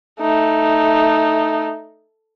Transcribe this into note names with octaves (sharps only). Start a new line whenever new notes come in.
A3 D#4